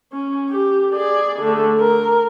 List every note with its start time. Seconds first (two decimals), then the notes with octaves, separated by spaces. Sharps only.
0.12 C#4
0.51 G4
0.93 G#4 D5
1.40 D3 A3
1.79 A#4